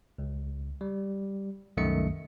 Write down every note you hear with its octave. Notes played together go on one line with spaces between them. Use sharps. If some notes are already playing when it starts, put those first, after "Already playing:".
C#2
G3
C2 F#2 D#3 A3 D#5 C#7